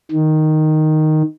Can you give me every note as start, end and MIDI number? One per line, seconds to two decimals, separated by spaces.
0.11 1.22 51